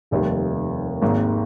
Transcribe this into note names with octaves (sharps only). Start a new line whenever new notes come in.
F1 D#2 D#3 G3
G#1 G#2 D#3 A#3